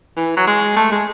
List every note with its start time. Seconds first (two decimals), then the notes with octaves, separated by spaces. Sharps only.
0.17 E3
0.37 F#3
0.47 G#3
0.76 A3
0.92 G#3